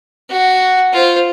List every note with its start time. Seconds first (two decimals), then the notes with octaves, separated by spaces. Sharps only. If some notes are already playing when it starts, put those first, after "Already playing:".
0.30 F#4
0.93 F4 C5